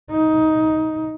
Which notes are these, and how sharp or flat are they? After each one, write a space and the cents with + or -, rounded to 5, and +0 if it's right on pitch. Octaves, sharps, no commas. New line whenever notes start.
D#4 +15